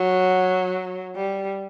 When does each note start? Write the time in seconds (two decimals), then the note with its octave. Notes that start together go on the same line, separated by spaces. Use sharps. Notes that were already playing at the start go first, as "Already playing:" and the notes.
Already playing: F#3
1.15 G3